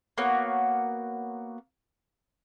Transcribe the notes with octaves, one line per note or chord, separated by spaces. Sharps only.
A#3 B3 F#4 C#5